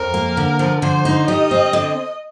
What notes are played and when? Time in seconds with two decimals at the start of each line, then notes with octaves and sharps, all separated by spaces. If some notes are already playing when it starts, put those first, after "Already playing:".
Already playing: F2 A#4
0.14 A#3
0.37 D3
0.59 F3
0.82 D3 C5
1.05 D#4
1.28 G3 D#5
1.51 C4
1.73 D3